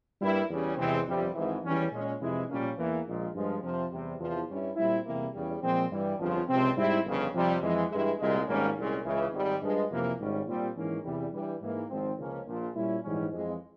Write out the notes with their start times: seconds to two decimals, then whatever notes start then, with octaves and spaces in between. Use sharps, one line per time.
0.20 G2 G3 A#3 E4
0.49 E2 C#3 G3 C#4
0.77 E2 C3 E3 G#3 C4
1.05 G1 F2 C3 G3 C4
1.34 G#1 G#2 E3
1.63 E2 E3 G3 C#4
1.91 A#2 G#3 C#4
2.19 F2 C3 E3 G#3 E4
2.49 A#1 A#2 G3 A#3 C#4
2.77 E2 E3 A#3
3.06 A#1 A#2 G#3
3.34 G2 F3 G#3
3.62 F2 C3 F3
3.91 E2 C3 G3
4.19 E2 C3 F3
4.48 G2 G3 C#4 E4
4.76 A#2 G3 C4 E4
5.04 E2 C3 G3 A#3 E4
5.33 E2 C#3 G3
5.62 A#2 F3 G#3 C4
5.91 G2 E3 G3
6.18 G1 F2 C#3 F3
6.47 C#2 C3 F3 C4
6.76 G#2 G3 C4 E4
7.04 G1 F2 C#3
7.32 F2 C3 G3
7.62 F2 E3 G#3
7.90 G2 E3 G#3 E4
8.19 C2 A#2 G#3
8.47 G#1 G#2 G3 A#3 C#4
8.75 C2 A#2 G#3 C#4
9.04 C#2 C#3 E3
9.32 G#1 G#2 G3
9.61 G2 F3 G#3
9.90 F2 C3 E3 A#3
10.18 G#1 G#2 G3 C#4
10.47 A#2 G3 C4
10.76 G#2 E3 A#3 C#4
11.03 E2 C3 E3 G3
11.32 G2 E3 G3
11.60 G#2 E3 A#3
11.89 G#1 G#2 F3 C4
12.17 C#2 C#3 F3 A#3 C#4
12.45 A#1 A#2 F3
12.75 A#2 G3 C#4 E4
13.03 A#1 G#2 E3 G3 C#4
13.31 F2 E3 G#3